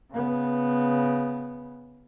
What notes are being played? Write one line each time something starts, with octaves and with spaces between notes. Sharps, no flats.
C#3 B3